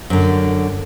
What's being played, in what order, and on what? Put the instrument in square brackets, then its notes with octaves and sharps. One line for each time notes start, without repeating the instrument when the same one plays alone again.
[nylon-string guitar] F#2 D3